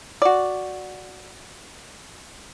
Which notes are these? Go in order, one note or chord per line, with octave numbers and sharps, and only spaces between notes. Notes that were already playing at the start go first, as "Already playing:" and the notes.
F#4 D5